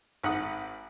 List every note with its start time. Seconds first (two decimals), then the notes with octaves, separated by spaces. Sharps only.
0.23 G#1 G#2 F#5 D#6